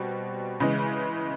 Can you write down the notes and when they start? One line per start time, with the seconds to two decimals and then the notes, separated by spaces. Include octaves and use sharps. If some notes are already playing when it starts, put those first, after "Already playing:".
Already playing: B2 G3 C4
0.60 C#3 E3 G#3